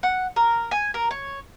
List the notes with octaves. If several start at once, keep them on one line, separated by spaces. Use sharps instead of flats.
F#5
A#4
G#5
A#4
C#5